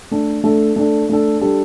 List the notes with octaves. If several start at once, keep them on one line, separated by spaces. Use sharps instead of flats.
A3 D4 A4
A3 D4 A4
A3 D4 A4
A3 D4 A4
G3 D4 A4